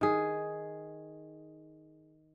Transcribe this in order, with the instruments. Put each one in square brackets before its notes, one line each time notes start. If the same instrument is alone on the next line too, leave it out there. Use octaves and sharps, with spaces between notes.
[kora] D#3 G#4